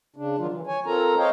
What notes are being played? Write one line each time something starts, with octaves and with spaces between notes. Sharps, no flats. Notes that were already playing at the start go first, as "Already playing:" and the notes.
C#3 D4
D#3 F#3 F4
E3
C#5 G#5
C4 F4 A4 A#4 A#5
C5 C#5 D#5 F5 G5